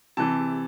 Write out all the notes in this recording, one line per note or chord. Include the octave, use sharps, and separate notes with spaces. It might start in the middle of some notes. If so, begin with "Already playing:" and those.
C3 E3 A5